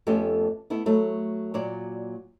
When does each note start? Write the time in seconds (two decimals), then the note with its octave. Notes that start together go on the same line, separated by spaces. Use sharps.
0.07 F2 A3 B3 C#4 G4 A4
0.70 A3 B3 E4
0.86 F#3 A3
1.54 A#2 F#3 D5